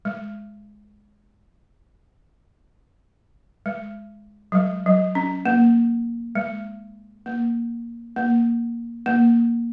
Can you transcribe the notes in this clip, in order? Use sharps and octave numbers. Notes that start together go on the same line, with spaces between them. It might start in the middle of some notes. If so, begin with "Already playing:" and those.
G#3
G#3
F#3
G#3
F#3
C#4
A#3
G#3
A#3
A#3
A#3